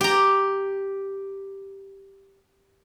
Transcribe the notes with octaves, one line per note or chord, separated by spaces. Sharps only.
G4 A#5